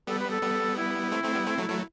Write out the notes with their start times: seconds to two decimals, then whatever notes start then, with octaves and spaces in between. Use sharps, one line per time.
0.07 G3 B3 A4
0.19 B4
0.30 A4
0.42 G3 B3
0.77 E4
1.12 A3 C4
1.24 A3 C4
1.35 G3 B3
1.46 A3 C4
1.58 F#3 A3
1.69 F#3 A3